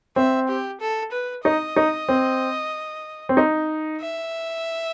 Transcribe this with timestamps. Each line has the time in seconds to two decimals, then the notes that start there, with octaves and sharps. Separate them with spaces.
0.16 C4 E5
0.48 G4
0.81 A4
1.12 B4
1.45 D#4 D#5
1.76 D#4
2.08 C4
3.29 C4
3.37 D#4
4.01 E5